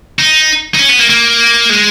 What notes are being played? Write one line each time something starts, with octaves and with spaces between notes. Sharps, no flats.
D#4
D#4
C#4
B3
A#3
A#3
G#3